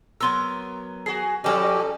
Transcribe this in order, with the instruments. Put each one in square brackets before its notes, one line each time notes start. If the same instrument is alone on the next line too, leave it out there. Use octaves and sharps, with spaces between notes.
[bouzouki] F#3 B3 A#4 [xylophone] C6 E6
[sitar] F#4 G#4 [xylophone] C7
[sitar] B2 F3 G3 [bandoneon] C#4 G4 [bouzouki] D#4 A4